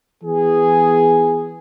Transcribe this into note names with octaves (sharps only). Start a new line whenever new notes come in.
E3 B3 G#4